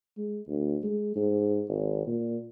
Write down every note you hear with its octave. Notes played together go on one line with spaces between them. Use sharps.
G#3
D2
G#3
G#2
G#1
A#2